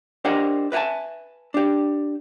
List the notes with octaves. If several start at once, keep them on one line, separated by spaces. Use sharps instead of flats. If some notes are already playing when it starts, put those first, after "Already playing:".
D4 G4 A#4 C5 D#5 F#5
B4 E5 F#5 G#5 A5
D4 G4